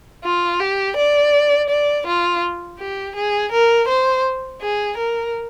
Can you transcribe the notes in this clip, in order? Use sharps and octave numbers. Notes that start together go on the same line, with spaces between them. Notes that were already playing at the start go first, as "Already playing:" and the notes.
F4
G4
D5
D5
F4
G4
G#4
A#4
C5
G#4
A#4